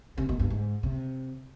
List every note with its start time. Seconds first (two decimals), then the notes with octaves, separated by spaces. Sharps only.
0.18 C3
0.29 B2
0.39 G2
0.50 G#2
0.83 C3